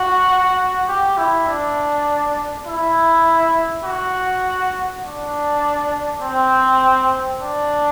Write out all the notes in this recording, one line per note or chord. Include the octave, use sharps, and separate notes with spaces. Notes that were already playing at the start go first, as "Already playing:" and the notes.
Already playing: F#4
G4
E4
D4
E4
F#4
D4
C4
D4